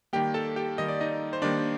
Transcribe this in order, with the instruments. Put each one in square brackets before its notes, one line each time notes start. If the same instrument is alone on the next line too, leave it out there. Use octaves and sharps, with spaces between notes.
[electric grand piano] D#3 G3 A#3 G4 G5
A4 A5
G4 G5
D#3 G3 A#3 D#5
D5
D#4 D#5
C5
D#3 G3 A#3 D4 D5